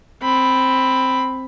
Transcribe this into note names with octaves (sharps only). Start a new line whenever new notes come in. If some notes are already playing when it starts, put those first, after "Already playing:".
C4 B5